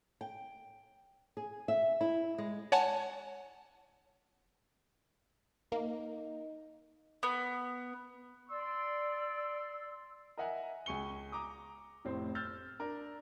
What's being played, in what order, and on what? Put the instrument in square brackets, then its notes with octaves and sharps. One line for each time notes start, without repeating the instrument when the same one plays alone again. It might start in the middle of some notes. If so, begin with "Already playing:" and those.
[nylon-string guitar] G5
G#4
E5
E4
G#3
[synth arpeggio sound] C#5 F#5 G#5 A5
[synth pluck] A#3 [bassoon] D#4
[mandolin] B3
[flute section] D5 [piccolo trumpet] C6 [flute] E6
[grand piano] A#4 D#5 E5 F#5 G#5 A#5
C#2 G#5 C#6 C#7 G7
A#5 D6 D#6
F1 A2 C4 C5
E6 F6 G6 A6
D4 A#4